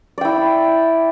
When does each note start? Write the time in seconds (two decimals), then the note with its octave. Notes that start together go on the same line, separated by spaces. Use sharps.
0.18 D5
0.21 G5
0.25 E4